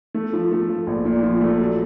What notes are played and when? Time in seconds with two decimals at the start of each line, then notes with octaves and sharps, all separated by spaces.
0.14 A3
0.33 F3
0.51 A3
0.69 F3
0.87 A#1
1.05 A#2
1.23 F3
1.41 A3
1.60 F#3